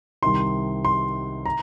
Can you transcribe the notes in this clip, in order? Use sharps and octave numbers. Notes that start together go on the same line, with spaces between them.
C2 C3 D#3 C6
C6
A#5